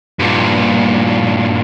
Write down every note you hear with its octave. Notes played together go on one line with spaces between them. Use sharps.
G2 A#2